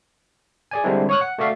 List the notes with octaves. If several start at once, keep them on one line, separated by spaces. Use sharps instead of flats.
G#4 D5 G#5
D3 G3 G#3 C4 D4 E4
C#5 C#6 D#6 F6 F#6
F#5
A3 F#4 D5 E5 F5